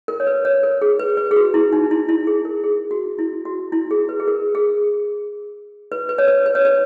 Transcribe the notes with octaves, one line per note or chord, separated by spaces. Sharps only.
A#4
C#5
B4
C#5
A#4
G#4
B4
B4
G#4
F#4
E4
D#4
E4
E4
G#4
A#4
G#4
F#4
E4
F#4
E4
G#4
B4
G#4
A#4
G#4
B4
B4
C#5
B4
B4
C#5
B4